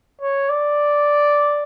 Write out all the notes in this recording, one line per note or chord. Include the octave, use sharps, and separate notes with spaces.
C#5
D5